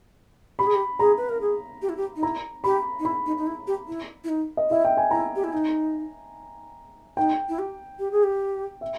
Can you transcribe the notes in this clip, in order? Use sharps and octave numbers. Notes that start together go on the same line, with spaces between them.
G4 B5
G#4
G4
G#4 A#5
B4
A#4
G#4
G4
E4
G4
D#4
E4 A#5
G4 B5
D#4
E4 B5
D#4
D#4
E4
G4
E4
E4
D#4
D#5
E4 E5
G5
G#5
E4 A#5
G4
E4
D#4
D#4 G5
E4
G4
G4
G#4
G4
E5